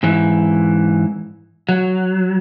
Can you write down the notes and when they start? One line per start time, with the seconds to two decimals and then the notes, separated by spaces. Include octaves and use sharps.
0.03 G#2 E3
1.69 F#3